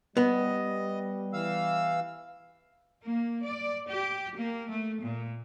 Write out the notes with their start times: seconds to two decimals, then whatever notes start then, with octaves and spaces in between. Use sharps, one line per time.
0.17 G3 B3 D#5
1.33 E3 F5 E6
3.05 A#3
3.44 D5
3.89 G4
4.37 A#3
4.70 A3
5.03 A#2